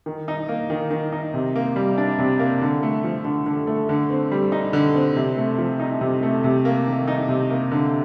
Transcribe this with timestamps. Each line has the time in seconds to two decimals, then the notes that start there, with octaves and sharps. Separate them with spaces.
0.06 D#3
0.28 D#4
0.49 A#3
0.70 D#3
0.91 D#3
1.12 D#4
1.34 C3
1.56 A#3
1.76 G3
1.98 D4
2.19 C3
2.39 A#3
2.62 D3
2.83 A3
3.04 F3
3.25 D3
3.46 D3
3.67 A3
3.89 D3
4.10 C4
4.32 G3
4.52 D#4
4.73 D3
4.94 C4
5.16 C3
5.37 A3
5.58 F3
5.79 D#4
6.01 C3
6.23 A3
6.44 C3
6.65 A#3
6.87 D#3
7.08 D#4
7.29 C3
7.50 A#3
7.72 D3